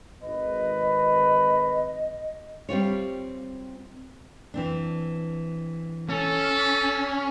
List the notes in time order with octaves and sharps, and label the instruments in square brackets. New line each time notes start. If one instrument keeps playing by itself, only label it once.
[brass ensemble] G#1 B4 [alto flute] D#5
[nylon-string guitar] G3 C4 F4 C#5
E3 C4 D4
[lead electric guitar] C#4 [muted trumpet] A4